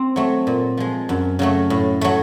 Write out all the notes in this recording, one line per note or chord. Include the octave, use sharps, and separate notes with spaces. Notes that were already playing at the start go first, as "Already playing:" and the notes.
Already playing: C4
F#3 A3
A#2
F3 G#3
F#2
C#3 F#3 A3
A2
F#3 A3